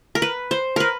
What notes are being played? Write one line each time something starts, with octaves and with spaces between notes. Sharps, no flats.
A#4
B4
C5
A#4 B4